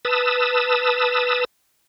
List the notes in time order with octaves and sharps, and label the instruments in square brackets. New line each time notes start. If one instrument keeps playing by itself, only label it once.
[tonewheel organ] B4 A5 D#6 E6